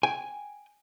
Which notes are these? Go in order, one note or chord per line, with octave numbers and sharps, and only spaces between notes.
G5 G#5